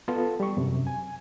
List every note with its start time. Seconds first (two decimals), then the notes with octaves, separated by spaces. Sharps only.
0.08 B3 F4 A4
0.40 G3 C#6
0.57 F#2 C3
0.87 G#5